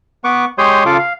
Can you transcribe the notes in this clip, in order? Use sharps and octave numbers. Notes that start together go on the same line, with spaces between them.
B3 B4 C#6 D6
G#3 G4 C#5 C6 D#6 G6
C#3 F4 A4 F5 D6
F5